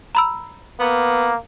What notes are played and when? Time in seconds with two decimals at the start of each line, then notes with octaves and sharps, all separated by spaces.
0.15 A#5 B5 E6
0.80 A#3 B3